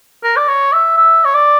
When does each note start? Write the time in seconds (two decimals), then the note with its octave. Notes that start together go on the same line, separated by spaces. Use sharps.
0.24 A#4
0.36 D5
0.48 C#5
0.73 E5
0.97 E5
1.25 C#5
1.34 D5